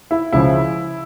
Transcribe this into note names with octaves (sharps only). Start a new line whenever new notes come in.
E4
C#2 C#3 F3 E4